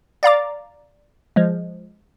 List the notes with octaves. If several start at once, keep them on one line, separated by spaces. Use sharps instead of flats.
D5 F5 A#5 D6
F3 G#3